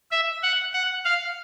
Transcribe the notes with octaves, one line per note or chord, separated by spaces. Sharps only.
E5
F#5
F#5
F5